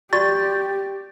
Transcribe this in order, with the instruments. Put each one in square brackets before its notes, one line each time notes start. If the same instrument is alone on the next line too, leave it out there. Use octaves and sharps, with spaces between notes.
[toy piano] F#4 D5 C#6 [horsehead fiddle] G4 [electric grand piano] A6